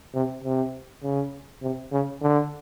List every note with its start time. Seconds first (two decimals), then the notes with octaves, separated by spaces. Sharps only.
0.14 C3
0.44 C3
1.03 C#3
1.62 C3
1.92 C#3
2.22 D3